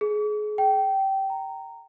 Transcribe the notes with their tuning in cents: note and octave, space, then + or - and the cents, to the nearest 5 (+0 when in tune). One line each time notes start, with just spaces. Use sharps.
G#4 +30
G5 -20
A#5 -15